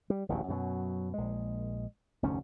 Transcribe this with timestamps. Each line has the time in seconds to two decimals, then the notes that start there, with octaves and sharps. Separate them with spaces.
0.10 G3
0.29 D1 A1 D#2 A#2
0.48 F#2 B2 E3 F#3
1.14 A#1 G#3
2.23 F1 D2 G#2 C#4